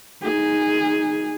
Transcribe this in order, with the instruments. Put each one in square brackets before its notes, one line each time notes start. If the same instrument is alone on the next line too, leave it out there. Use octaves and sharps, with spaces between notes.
[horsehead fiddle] D#4 G#4